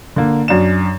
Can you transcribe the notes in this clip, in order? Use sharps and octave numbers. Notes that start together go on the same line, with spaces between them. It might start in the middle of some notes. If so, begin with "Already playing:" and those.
D3 A#3
F#2 D4 E7